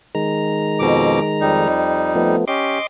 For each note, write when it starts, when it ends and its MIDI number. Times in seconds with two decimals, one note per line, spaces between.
0.15 1.68 51
0.15 1.68 56
0.15 1.68 82
0.79 1.19 41
0.79 1.19 47
0.79 1.19 86
1.41 2.36 41
1.41 2.36 55
1.41 2.36 63
2.15 2.45 53
2.15 2.45 57
2.15 2.45 59
2.48 2.79 61
2.48 2.79 67
2.48 2.87 75
2.48 2.87 84
2.48 2.87 86